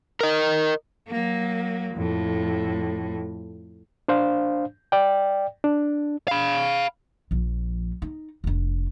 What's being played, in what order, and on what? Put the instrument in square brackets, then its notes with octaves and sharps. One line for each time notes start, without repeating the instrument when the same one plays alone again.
[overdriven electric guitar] A#4 D#5
[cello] F#3 A#3
F2 A2
[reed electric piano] D4 C5 F5
D5 G5
D4
[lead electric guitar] F5 B5
[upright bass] A#1 F3
D#4
F1 D4